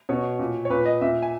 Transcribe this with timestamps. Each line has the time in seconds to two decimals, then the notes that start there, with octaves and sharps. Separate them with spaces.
0.09 B2 C#5
0.39 A#2
0.65 C#5
0.70 A#2 B4
0.86 D#5
1.01 A#2 E5
1.23 G#5